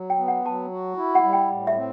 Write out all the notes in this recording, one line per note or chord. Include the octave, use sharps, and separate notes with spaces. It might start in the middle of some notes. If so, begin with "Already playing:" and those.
Already playing: F#3
G5
B3
F#5
F#3 A5
F#4
E4
F#5
G3
G5
A2
E5
C4